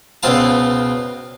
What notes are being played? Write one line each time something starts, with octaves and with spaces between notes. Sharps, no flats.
C#2 B2 C4 F4 A5